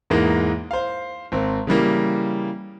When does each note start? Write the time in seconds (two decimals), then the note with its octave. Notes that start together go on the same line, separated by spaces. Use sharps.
0.10 E2 G#2 E3 G#3 A#3
0.71 C5 F5
1.32 G#1 C4
1.67 C#3 E3 G3 A#3